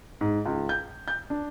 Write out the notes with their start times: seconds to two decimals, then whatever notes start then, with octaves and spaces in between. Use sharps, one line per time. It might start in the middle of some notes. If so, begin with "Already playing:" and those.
0.21 G#2
0.46 C#2
0.69 G6
1.08 G6
1.30 D4